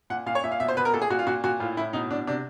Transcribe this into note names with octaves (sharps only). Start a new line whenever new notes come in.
A#2 F#5
A#2 F5
C#5
A#2 E5
F5
B2 E5
C5
B2 B4
A#4
A#2 A4
G#4
A#2 F#4
F4
A#2 F#4
A#2 F#4
A2 F4
A2 E4
B2 D#4
B2 D4
C3 D4